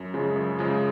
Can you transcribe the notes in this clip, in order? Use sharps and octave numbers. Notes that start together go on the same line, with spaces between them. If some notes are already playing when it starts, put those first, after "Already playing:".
Already playing: F#2
C#3 F3 G#3
F#2
C#3 F3 G#3